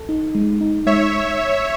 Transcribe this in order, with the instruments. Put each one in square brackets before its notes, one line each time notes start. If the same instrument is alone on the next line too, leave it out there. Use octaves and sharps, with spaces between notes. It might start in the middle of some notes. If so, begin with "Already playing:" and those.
Already playing: [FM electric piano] A4
D#4
G#3
D#4
[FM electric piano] G#3 [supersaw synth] C#5 E5